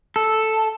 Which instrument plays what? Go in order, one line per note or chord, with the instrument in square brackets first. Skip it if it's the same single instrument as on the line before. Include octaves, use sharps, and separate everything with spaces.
[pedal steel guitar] A4